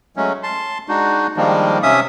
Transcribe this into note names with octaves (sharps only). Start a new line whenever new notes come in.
F#3 G#3 A3 C#4
A5 C6
G#3 D4 D#4 F#4
D#3 F3 G3 G#3 A#3 D4
C3 C#4 E5 D#6